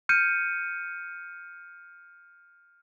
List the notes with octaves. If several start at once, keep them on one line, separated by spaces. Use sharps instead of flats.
F6 G6 C#7 D#7